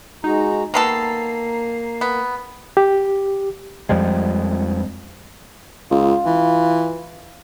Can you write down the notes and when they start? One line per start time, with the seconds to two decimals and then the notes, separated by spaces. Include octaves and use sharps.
0.24 G#3 D#4 F#4 A#5
0.74 D#3 A#3 B3 A4 A#5 C7
2.01 B3
2.77 G4
3.89 F2 F3 G3 G#3
5.91 C#2 F4
6.26 E3